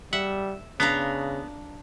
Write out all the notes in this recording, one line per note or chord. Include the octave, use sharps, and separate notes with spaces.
G3 E5 F#5
C#3 B3 D4 F5 A#5